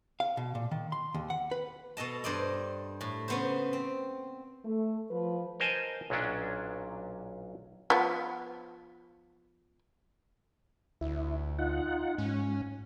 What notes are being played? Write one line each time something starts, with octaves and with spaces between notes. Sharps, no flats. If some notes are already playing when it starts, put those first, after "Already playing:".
F5
B2
A#2
D#3
C6
D#2
F#5
B4
B2 A4 D#5 A5
G2 C5 D5 D#5
A2
C#3 B3 C5
C4
A3
F3 B4
A#4 C5 D#5 G#5 A5
B1 A#2 F#3 C#4 D4
F3 B3
D2 E4
D#4 F4 F#5
G#2 C#4